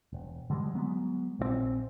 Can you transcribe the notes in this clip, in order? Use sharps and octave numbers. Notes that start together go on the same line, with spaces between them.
E1
D3 E3 G3 G#3
F#3 G#3 B3
A#1 D#3 C4